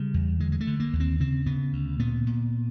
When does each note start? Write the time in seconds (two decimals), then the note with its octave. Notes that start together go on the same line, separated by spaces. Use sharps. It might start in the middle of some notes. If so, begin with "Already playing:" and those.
Already playing: C#3 G3
0.14 E2
0.40 D3 G#3
0.52 G#3
0.60 A3
0.67 D3
0.80 A#3
0.93 D#2
1.00 C4
1.20 C#3 C4
1.46 C#3 B3
1.73 D2
1.99 A#2 B3
2.27 A#2